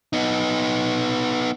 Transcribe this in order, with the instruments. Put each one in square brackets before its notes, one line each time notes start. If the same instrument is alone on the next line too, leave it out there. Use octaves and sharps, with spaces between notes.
[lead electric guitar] B3 D#4